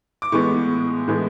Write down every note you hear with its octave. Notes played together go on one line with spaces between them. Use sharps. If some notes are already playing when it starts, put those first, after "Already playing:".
D6
A2 E3 G#3 B3 C#6
A2 E3 G#3 B3